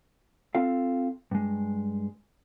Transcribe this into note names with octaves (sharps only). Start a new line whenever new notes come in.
C4 F4 A4 F5
G2 G#3